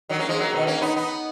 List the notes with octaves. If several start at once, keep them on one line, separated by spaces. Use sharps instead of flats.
D#3 F#3
A#3 C#4
F3 G#3
F#3 A#3
B2 D#3
A#3 C#4
B3 D#4
B3 D#4